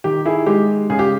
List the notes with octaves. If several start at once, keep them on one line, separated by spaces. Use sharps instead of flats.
D#3 G4
E4 G#4
G#3 G4
C#3 G#4
G4